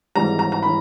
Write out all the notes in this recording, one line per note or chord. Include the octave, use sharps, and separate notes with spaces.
G#1 G#2 E3 G3 A#5
A#5
A#5
E3 B5